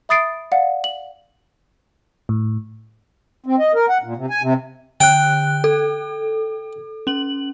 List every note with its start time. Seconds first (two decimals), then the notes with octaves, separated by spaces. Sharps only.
0.09 E5 B5 D#6 A6 C7 D7
0.52 D5 F5 F#5
0.84 F#7
2.29 A2
3.46 C4
3.59 D#5
3.75 A#4
3.89 F#5
4.03 A#2
4.17 C3
4.30 G#5
4.42 C3
5.00 D3 G5 F#6
5.64 A4
7.07 C#4 F#7